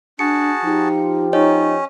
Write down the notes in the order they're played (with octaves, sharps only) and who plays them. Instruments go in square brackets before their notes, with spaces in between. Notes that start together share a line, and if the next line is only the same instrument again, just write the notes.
[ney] D4 [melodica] F#4 G#4 A5 [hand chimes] C#7
[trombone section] F3 F4 G4 [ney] D#4
[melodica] C#4 [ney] D#4 [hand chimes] C#5 D#5